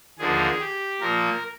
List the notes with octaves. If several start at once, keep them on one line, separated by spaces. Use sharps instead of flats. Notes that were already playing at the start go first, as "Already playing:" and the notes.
D#2 D3 F3 A#3 G#4
G4
A#2 F3 A#3 A#4